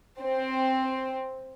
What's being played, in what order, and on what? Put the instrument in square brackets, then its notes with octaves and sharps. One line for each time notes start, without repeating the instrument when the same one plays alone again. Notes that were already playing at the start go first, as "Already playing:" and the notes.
[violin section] C4